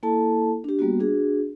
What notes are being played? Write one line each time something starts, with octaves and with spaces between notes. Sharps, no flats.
A#3 E4 A4 A5
D4 G4
G3 A#3 B3 F#4
D4 F#4 G#4